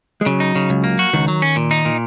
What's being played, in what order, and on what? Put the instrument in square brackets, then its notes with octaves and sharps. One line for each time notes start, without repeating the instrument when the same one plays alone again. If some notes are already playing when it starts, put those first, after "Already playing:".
[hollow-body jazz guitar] G#3
[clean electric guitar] C#3 [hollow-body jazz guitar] F#3
[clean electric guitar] D#4
C#3
C#2
A#3
F#4
[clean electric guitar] C#2 [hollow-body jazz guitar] D#3
[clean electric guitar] F#3
C#4
A#2
D#4
A#2